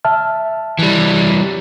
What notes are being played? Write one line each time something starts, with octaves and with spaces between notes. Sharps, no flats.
E5 A5 F6
E3 G3